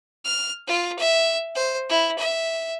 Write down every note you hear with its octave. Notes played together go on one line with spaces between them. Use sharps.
F6
F4
E5
C5
E4
E5